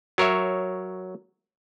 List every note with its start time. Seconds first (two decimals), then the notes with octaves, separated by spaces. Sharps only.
0.18 F#3 A#4 C#5 E5